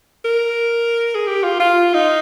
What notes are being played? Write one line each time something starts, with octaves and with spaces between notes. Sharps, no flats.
A#4
G#4
G4
F4
F4
D#4